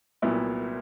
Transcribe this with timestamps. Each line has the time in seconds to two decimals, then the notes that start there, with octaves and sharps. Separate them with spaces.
0.22 C2 A#2 F#3 B3 E4